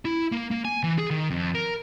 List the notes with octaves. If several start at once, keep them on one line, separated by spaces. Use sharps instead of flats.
E4
A#3
A#3
G#5
E3
G#4
D#3
F2
A#4